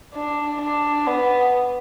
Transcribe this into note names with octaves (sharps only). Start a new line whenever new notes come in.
D4
D4
B3